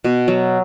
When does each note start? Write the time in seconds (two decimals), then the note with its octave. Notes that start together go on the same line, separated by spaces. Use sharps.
0.04 B2
0.28 F#3